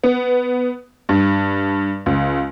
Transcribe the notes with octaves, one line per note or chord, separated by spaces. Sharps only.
B3
G2
C#2